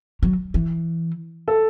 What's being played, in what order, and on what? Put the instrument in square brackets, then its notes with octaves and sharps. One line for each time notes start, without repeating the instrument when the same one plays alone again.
[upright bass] F#3
E3
[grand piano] A4